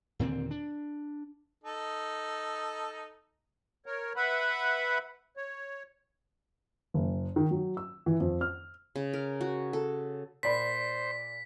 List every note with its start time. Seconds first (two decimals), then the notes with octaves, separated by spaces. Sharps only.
0.19 D#2 A#2 D3 C4
0.51 D4
1.64 D#4 A4
3.86 A#4 C#5
4.16 B4 E5 F#5 B5
5.37 C#5
6.94 F#1
7.36 D#3
7.51 F#3
7.77 E6
8.06 E3
8.20 F2
8.41 F6
8.96 C#3
9.13 A#4
9.41 F#4
9.73 A4
10.43 A#2 C5 D5 B5 B6